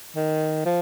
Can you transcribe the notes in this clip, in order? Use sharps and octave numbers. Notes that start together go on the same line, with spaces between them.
D#3
F3